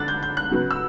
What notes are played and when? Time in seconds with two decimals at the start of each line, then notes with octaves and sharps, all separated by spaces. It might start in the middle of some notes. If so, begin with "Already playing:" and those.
Already playing: D3 D6 F#6 A6
0.08 G6
0.23 G6
0.37 F#6
0.51 C#3 F#3 B3
0.71 E6